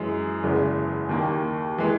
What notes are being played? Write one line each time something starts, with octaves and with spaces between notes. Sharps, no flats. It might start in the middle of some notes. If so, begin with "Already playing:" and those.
Already playing: F#2 E3 G#3 G#4
F#1 E2 C#3 E3 G#3
D#2 D#3 A#3
E3 G#3